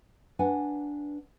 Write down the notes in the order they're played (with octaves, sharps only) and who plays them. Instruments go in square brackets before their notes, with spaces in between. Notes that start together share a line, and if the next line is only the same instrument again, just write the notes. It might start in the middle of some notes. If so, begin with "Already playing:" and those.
[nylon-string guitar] D4 B4 F#5 G#5